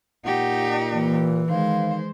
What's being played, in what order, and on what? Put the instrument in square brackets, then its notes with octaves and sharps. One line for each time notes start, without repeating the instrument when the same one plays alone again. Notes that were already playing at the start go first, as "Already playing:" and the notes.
[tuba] A#2 [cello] D#4 G4 [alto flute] F#5
[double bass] E3 [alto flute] A#3
[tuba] D#3 [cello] G#3 C5 [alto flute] F5